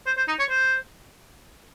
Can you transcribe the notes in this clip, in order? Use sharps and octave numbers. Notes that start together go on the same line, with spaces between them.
C5
C5
D#4
C#5
C5